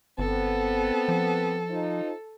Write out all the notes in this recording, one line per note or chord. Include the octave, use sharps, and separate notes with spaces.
G1 B3 C4 A4
F3
D#4 F4 C5